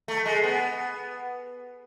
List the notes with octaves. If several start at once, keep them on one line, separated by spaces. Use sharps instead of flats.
A3
G#3
B3